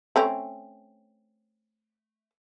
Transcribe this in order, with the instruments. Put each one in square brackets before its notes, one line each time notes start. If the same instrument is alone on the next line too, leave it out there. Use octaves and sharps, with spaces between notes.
[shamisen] A3 C4 C#4